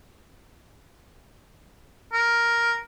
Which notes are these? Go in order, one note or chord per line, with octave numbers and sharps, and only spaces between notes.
A#4